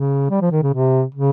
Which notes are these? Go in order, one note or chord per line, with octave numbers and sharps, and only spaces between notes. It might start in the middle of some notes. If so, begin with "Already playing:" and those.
Already playing: C#3
G3
F3
D#3
C#3
C3
C#3